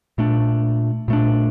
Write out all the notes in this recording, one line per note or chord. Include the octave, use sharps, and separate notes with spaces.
A#2 A3 D4
A#2 A3 D4